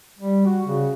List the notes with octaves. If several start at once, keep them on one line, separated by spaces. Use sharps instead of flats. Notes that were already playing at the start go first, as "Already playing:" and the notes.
G3
F#4
C#3